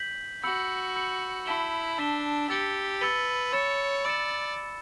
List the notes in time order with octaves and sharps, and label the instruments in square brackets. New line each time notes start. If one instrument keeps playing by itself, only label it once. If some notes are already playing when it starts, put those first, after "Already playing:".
Already playing: [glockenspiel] G6 B6 F#7
[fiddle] F#4 [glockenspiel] B5 E6 G6 C#7 F#7
[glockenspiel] B5 E6 G6 C#7 F#7
[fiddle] E4 [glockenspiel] A5 E6 B6 E7 G7
[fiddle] D4 [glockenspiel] A5 E6 B6 E7 G7
[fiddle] G4 [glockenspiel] E6 A6 C#7 G7
[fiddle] B4 [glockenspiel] E6 A6 C#7 G7
[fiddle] C#5 [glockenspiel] B5 E6 A6 C#7 E7
[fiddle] D5 [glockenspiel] B5 E6 A6 C#7 E7